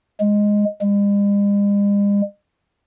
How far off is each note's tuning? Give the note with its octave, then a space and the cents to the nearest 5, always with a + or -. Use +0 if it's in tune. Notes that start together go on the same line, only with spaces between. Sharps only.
G#3 -5
G#3 -45